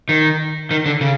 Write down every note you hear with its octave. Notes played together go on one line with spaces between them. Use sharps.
D#3
D#3
D3
C#3